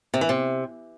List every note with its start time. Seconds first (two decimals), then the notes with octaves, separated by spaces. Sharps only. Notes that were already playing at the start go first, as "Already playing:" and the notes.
0.14 C3
0.21 E3
0.29 C3